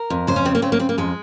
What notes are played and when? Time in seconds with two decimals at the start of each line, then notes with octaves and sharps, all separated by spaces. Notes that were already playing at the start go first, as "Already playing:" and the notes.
Already playing: A#4
0.10 F2
0.27 C#3 C5
0.36 C#4
0.45 C#3 C4
0.55 A#3
0.62 C#3 C4
0.72 A#3
0.79 C#3 C4
0.89 A#3
0.98 F2 G#3